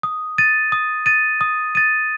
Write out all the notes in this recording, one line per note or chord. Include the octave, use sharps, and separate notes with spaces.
D#6
A6 D#7
D#6
A6 D#7
D#6
A6 D#7